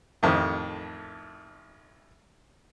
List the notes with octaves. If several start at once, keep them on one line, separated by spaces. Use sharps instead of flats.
A1 F2 D#3